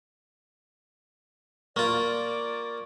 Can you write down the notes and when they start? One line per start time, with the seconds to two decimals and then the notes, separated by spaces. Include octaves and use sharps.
1.76 A#3 F4 D5 C#6